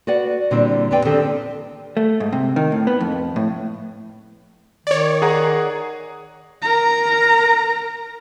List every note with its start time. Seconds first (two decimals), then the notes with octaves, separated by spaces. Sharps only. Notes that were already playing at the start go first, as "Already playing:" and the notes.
0.07 F#4 B4 D5 F#5
0.51 A#2 D3 G3 C4 E4
0.91 F2 C4 G4 B4 D5 G5
1.05 D3 D#3 C4 G4 A4
1.97 A3
2.20 G#2
2.33 C3
2.56 D#3
2.72 A2
2.87 B3
3.00 F2
3.36 A2
4.87 D#3 C#5 D5
5.22 G#4 F#5 A#5
6.62 A#4 A#5